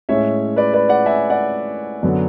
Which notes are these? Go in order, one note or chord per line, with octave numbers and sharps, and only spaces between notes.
A2 G#3 C#4 C#5 E5
B4 D5
B4 D5
D5 F#5
E5 G#5
D5 F#5
F#2 D3 F#3 B3